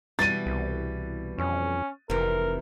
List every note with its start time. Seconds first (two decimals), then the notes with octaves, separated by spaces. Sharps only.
0.19 B2 E3 G3 A6 D#7
0.46 C2
1.38 F2 C#4
2.10 F1 C3 E3 A#4